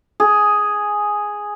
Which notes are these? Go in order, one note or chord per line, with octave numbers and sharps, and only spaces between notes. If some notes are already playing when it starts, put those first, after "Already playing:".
G#4